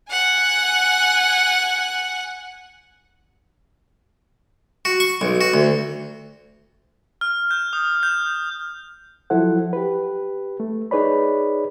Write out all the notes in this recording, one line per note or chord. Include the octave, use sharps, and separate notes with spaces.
F#5 G#5
F#4
C#6
B1
F#4
D2
F6
G6
D#6
G6
F3 F#3 E4 A4 C5 F#5
G4 B4
A3
D#4 G#4 B4 C#5 D5 B5